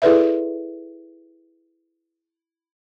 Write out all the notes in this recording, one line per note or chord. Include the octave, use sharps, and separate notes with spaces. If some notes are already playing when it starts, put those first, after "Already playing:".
E4 G#4 A4 B4 D5 E5